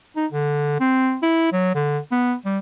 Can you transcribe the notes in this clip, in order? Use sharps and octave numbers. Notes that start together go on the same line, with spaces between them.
D#4
D3
C4
E4
F#3
D3
B3
G3